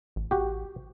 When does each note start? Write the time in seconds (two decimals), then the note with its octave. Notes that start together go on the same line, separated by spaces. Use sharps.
0.16 A1
0.31 F#4 G4